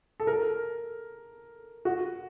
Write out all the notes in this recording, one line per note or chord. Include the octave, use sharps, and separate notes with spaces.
A4
A#4
F#4